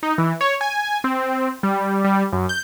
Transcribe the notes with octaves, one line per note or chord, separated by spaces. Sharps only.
D#4
E3
C#5
G#5
C4
G3
G3
F#2
G6